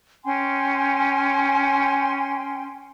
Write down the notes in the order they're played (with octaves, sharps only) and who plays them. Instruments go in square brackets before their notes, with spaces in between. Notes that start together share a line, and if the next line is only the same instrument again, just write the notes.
[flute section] C#4 G5 G#5 C6